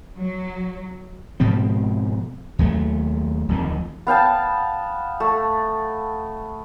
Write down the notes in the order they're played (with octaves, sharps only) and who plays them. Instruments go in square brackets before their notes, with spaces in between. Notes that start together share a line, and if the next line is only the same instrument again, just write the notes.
[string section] F#3
[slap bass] G#2 B2 F3 C4
D#2 F#3 A3
D1 F2 D#3
[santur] B3 F5 G5 A5
A3